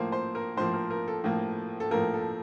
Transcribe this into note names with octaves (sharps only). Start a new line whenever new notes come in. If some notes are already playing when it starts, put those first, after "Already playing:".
Already playing: A2 F3 A#3 C5
C5
A#4
A2 F3 A#3 C5
A#4
A#4
A4
A2 F3 A#3
A4
A2 F3 A#3 A#4
A4